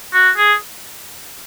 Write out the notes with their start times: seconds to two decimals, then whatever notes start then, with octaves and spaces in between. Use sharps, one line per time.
0.14 F#4
0.37 G#4